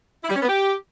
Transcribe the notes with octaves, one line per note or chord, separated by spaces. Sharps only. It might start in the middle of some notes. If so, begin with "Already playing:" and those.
E4
G3
C#4
B3
G4